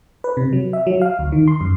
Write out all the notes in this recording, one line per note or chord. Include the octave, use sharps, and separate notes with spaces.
B4
C3
F#3
E5
F#3
F5
D2
D#3
C6
F#2